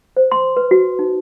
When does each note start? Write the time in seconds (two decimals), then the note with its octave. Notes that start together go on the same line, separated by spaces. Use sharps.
0.17 C5
0.32 C6
0.57 B4
0.71 F#4
0.99 D#4